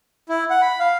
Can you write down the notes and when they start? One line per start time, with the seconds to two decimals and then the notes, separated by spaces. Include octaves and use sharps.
0.29 E4
0.50 F#5
0.62 B5
0.80 F5